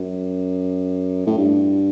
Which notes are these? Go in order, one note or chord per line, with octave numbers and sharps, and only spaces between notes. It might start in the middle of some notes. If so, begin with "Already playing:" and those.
Already playing: F#2
A2
G2